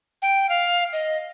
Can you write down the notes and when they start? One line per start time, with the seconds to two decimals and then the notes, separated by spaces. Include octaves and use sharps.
0.22 G5
0.49 F5
0.93 D#5